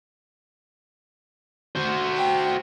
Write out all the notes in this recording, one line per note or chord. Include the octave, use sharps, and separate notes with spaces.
F#4 C5
G5